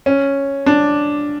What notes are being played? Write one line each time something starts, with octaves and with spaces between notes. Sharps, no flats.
C#4
D4